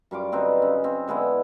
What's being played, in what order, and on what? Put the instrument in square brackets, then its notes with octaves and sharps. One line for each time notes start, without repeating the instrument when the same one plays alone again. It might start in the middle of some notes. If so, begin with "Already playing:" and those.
[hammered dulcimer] F#2 G3 F4 D6
D3 C4 D#4 B4
C#3
C4
D3 G#3 B3 E4